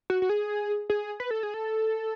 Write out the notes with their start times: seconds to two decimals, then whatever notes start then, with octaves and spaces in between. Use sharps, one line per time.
0.10 F#4
0.22 F#4
0.29 G#4
0.90 G#4
1.20 B4
1.31 A4
1.43 G#4
1.54 A4